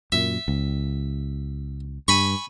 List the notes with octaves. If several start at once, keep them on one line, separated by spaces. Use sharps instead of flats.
F#2 A#2 E5
C#2
G2 G#5 B5 C#6